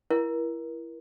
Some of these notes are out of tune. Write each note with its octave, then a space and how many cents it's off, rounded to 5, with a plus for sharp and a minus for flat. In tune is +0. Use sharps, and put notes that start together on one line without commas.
E4 +20 A#4 +35